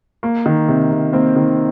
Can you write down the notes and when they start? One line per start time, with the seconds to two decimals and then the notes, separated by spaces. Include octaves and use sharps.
0.23 A#3
0.46 D#3
0.68 C3
0.91 C3
1.13 A#3 C4
1.36 D#3